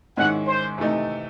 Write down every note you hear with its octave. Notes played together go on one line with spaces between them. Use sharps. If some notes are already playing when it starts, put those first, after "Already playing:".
G#2 D#3 G#3 C#4 E4 F#5
C5
C3 E3 A3 D#4